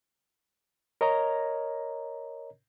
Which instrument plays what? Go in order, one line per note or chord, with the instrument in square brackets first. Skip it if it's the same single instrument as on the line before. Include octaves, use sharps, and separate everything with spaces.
[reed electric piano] A#4 C#5 D#5 A#5